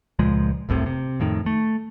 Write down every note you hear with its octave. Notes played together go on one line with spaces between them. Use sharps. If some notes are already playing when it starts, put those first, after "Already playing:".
C#2 A#2 F3 G#3
F1 C2 A2 C3
C3
F2 A2 D#3
A3